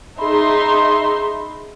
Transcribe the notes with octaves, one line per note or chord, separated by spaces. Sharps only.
D#4 G#4 E5 B5 C6